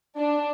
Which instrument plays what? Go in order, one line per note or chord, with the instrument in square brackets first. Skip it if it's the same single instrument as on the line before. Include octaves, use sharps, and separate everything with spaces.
[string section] D4